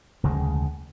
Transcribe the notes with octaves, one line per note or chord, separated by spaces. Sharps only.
F1 D2 C#3 G#3